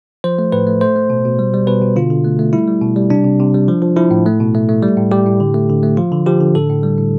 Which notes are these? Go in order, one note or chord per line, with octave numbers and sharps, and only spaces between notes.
F3 C5
A3
A2 B4
A3
A3 C5
A3
B2
B2
G3
G3
B2 B4
B2
D3 F4
D3
A3
A3
G3 E4
G3
B2
G3
C3 D4
C3
C3
G3
F3
F3
F3 E4
A2
A3
B2
A3
A3
G3
A2
G3 G4
A2
D3
A3
D3
A3
F3 F4
D3
F3 G4
D3
A2 A4
A2
G3
A2